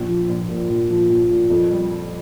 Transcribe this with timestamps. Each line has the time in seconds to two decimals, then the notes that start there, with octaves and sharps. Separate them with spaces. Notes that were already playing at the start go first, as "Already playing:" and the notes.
Already playing: A#1
0.09 F3
0.29 A#1
0.49 A#2
0.69 A#1
0.90 F3
1.10 A#1
1.30 A#2
1.50 F2
1.71 G3